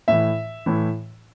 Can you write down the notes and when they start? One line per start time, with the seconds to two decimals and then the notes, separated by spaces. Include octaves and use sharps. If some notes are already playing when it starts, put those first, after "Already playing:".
0.08 A2 E3 E5
0.66 A2 E3